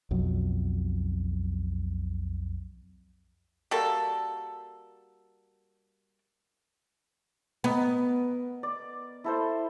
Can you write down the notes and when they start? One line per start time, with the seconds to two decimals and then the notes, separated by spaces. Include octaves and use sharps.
0.11 B1 F2 F#3
3.71 G3 A#3 F#4 A4
7.64 B3 A#4 D#5
8.63 D5
9.24 E4 A4 C5